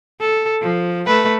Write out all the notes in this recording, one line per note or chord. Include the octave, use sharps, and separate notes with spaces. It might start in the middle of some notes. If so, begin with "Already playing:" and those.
A4
F3
A3 B4